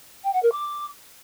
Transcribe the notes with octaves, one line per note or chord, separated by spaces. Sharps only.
G5
F#5
A#4
D6